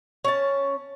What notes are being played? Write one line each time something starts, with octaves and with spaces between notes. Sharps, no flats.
C#4 A5